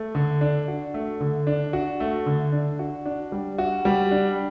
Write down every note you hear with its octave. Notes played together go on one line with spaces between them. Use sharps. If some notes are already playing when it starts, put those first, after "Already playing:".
Already playing: A3
D3
D4
F#4
A3
D3
D4
F#4
A3
D3
D4
F#4
D4
G3
F#4
G3
D4